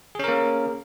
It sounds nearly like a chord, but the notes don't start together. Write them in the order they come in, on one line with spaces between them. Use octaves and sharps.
G#4 C#4 A#4 A#3